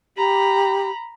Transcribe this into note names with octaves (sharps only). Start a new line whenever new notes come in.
G4 A#5 B5